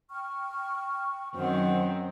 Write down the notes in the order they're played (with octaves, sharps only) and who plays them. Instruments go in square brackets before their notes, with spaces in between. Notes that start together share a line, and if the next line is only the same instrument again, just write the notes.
[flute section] G5 C#6 F6
[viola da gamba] F#2 D#3 C4 [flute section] C5 F#5